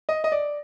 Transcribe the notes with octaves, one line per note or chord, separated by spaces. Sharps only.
D#5
D#5
D5